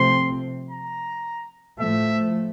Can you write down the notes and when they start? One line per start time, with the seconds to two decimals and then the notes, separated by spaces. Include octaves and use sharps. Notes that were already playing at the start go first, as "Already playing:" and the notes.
Already playing: C3 F3 A3 C4 C6
0.70 A#5
1.80 A2 F3 A3 E5